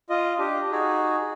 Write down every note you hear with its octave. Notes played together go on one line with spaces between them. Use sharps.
F4 D#5
D4 G4
D#4 F#4 G#4